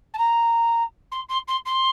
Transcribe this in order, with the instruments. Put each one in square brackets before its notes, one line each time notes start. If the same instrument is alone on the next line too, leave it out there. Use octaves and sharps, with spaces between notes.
[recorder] A5
A#5
C6
C6
C6
C6